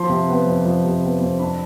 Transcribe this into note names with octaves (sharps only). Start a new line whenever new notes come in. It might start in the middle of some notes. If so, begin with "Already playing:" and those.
Already playing: F3 C6
C3
B3
F2
F3
C3
B3
F2
D4 B5